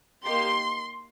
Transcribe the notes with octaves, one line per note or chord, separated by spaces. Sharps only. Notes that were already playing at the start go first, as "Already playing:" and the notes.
A#3 D#4 G4 C6